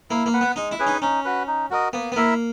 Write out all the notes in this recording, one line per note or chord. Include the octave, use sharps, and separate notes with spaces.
A#3 E4
A#3
B4 F#5
B3
G#3 D#4
E4
C#4 G#4 B4
D#4
C#4 D#4
F#4 B4
D#4
F#4 A#4 D#5
A#3 B3
B3
A#3 E4 A#4 E5